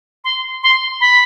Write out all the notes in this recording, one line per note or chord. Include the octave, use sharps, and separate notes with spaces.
C6
C6
B5